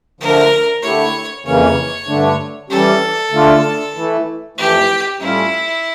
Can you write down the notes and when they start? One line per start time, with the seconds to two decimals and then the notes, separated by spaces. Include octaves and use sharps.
0.20 D3 F3 A3 D4 A#4
0.82 D3 A3 E4 G4 C#5
1.46 F2 C#3 E3 A#3 C#4 C#5
2.08 G2 D3 A3 D4
2.70 E3 G3 C#4 G4 A4
3.32 D3 A3 D4 F4
3.95 E3 A3 E4
4.58 F2 E3 A3 G4
5.20 A2 G3 C#4 E4 F4